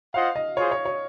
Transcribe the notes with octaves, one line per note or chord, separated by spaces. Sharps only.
F4 C5 D#5 F5 F#5
D#5
F4 G#4 C5 C#5
C#5
C#5